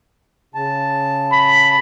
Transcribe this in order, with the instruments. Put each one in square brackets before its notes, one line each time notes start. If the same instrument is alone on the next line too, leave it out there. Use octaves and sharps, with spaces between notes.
[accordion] C#3 A5
[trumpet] B5